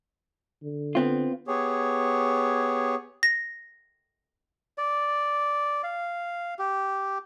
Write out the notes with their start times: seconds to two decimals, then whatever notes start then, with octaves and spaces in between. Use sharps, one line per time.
0.62 D3
0.95 B3 C4 F4
1.48 B3 G4 G#4 C#5
3.23 A#6
4.78 D5
5.83 F5
6.59 G4